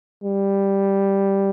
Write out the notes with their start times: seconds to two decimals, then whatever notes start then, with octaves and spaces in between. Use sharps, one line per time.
0.24 G3